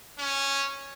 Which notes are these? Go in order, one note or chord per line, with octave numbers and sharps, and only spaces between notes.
C#4